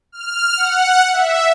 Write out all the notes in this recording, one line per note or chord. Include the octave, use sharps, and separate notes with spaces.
F6
F#5
E5